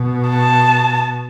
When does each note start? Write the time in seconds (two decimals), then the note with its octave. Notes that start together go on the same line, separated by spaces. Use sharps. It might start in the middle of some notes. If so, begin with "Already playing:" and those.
Already playing: B2
0.29 A5